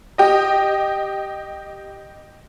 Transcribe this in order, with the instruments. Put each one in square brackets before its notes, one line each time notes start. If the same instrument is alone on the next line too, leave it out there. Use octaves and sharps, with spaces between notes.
[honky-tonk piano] G4 D#5